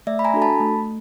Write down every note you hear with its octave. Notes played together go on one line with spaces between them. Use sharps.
A3 D5 E5
B5
G#5 A#5
D4 F#4 A4
A5 B5
A3